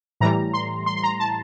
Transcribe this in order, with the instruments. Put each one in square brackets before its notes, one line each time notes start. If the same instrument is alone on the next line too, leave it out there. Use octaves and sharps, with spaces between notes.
[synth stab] A2 E3 G3 A#5
C6
C6
C6
A#5
A5